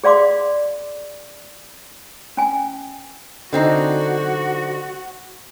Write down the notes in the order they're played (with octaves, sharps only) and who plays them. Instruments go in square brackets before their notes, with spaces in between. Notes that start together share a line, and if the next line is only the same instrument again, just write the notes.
[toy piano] G#4 D5 F5 C6 D6
C#4 G#5
[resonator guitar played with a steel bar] D3 C4 D#4 [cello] F#4